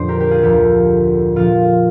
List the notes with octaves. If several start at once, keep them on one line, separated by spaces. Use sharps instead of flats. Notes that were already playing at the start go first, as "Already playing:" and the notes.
Already playing: F2 A#2 D3 C5 D5
G4 A#4
G4 A#4
F4 G#4
D2 D3 F3 G4
A#2 F3 F4